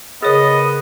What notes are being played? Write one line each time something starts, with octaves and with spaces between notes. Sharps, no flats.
C#3 B3 G#4 A#4 C#5 D#5 A6